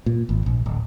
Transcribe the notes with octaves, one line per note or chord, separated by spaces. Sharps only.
A#2
G#1
A#1
D1